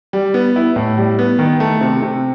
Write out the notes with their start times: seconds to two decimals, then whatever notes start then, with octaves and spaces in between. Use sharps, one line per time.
0.13 G3
0.34 B3
0.56 E4
0.76 A2
0.98 G3
1.19 B3
1.39 D#3
1.60 A3
1.81 C3
2.02 C3